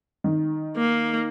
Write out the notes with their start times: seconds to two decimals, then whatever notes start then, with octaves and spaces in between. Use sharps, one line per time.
0.24 D#3
0.77 A#3